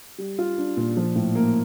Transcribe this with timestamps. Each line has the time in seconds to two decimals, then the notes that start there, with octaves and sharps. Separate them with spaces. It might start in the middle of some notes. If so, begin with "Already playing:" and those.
0.18 G3
0.38 F4
0.58 D4
0.77 A#2
0.97 F3
1.16 A2
1.35 A#3